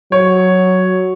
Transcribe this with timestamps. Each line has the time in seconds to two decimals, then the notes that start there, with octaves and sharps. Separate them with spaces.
0.12 F#3 C#5